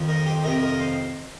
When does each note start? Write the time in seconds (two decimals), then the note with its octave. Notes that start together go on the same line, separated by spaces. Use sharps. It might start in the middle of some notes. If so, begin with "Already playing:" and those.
Already playing: F2 D#3
0.09 A#4 D#5
0.26 G4 C5
0.44 F2 C3 D#3 A#4 D#5
0.62 A#4 D#5
0.79 C5 F5